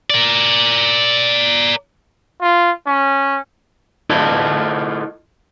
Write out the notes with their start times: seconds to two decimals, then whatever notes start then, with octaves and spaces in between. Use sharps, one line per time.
0.10 A#4 D5
2.41 F4
2.87 C#4
4.10 E4 F4 A4 D#5